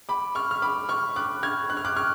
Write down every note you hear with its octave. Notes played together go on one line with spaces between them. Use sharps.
B5 D6
C#6 F6
F6
B5 D6
C#6 F6
D6 F#6
F6 G#6
F#6
F6
D6 F#6
C#6 F6